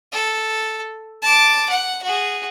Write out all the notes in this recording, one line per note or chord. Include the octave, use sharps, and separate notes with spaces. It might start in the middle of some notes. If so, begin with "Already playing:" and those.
A4
A5 D6
F#5
F#4 G#4